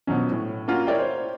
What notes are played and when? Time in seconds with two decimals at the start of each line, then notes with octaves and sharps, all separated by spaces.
0.07 B2 F3 F#3 C#4
0.32 A2
0.68 A#3 C#4 F4 F#4
0.87 E4 A#4 C#5 D5 E5 G5
0.98 C5 C#5